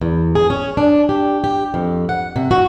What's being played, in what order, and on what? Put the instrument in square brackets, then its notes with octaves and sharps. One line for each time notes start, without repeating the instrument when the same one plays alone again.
[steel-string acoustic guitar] E2
G#4
C#4
D4
G4
G4
F2
F#5
C3
F#4